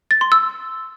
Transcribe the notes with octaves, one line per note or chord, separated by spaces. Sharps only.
A6
C6
E6